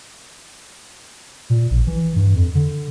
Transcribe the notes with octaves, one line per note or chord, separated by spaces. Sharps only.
A#2
A#1
E3
G2
F2
D3